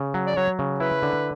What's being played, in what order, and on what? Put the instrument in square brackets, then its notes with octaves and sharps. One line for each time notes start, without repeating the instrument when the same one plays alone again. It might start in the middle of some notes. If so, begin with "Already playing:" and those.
Already playing: [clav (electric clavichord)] C#3
F#3
[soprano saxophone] D5
[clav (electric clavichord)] F#3 [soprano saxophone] C#5
[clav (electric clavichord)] C#3
[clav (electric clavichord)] E4 [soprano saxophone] B4
[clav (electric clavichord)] D3